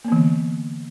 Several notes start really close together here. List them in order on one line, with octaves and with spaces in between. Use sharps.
A#3 B3 E3 D3